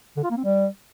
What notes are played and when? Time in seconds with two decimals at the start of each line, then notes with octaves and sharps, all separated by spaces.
0.17 D3
0.24 F4
0.31 A#3
0.37 C4
0.44 G3